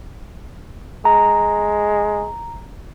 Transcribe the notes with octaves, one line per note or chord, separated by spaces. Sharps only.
G#3 A#5